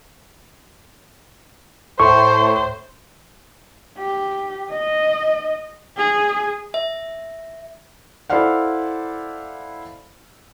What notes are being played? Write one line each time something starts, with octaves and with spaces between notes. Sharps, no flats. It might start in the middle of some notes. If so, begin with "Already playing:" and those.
A2 C5 C#6
G4
D#5
G#4
E5
E4 A4 C5 D5 F5 F#5